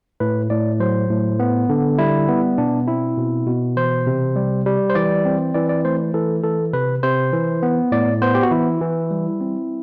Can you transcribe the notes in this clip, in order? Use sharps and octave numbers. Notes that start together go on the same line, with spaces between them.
A2 B4
A2 D5
F#3 C5
A2
B3
D3
G3 E4
B3
B2 D4
C4 E4
B2
B2
E3 C5
C3
G3
G3
C5
E3 D5
C4
E3 D5
D5
A3 C5
E3 A4
E3 A4
C3 B4
C3 C5
E3
B3
A2 D5
B3 C5
G4
F#4
E3 E4
E3
G3
C4